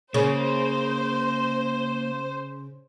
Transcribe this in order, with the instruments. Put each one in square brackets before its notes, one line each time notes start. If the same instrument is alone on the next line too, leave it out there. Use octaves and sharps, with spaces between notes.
[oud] C#3 [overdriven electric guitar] A#3 [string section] C5